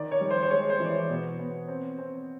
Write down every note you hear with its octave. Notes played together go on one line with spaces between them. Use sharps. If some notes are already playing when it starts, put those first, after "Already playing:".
Already playing: D#3 D5
C#5
G3
C5
C5
G#3 C#5
C5
E3 D5
C#5
B2
B3
C4
C4